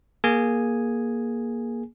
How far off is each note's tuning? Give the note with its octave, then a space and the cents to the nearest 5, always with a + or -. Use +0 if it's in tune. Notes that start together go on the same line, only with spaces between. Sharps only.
A#3 +15 G#4 +0 G#5 +0